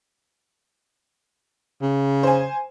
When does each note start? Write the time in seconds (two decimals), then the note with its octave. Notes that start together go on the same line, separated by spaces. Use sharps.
1.82 C#3
2.23 C5 G#5